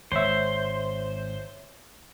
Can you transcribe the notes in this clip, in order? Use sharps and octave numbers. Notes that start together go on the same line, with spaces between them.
G#1 C5 C#5 E5